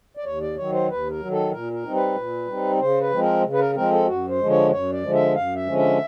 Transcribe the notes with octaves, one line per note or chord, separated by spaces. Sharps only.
D5
D#2 C#5
D5
D#3 F#3 C#5
C5
D#2 B4
A#4
F#3
D#3
A4
A#2 A#4
A#4
G3 C4 D#4
B4
A#2
G3 C4 D#4
C#3 C5
B4
F3 G#3 C4
A#4
C#3
B4
A#4
F3 G#3 C4 A#4
A4
F#2 F#4
C5
D3 F3 G#3
C#5
F#2 C#5
D5
D3 F3 G#3
E5
F#2 F5
E5
D3 F3 G#3 C#4
E5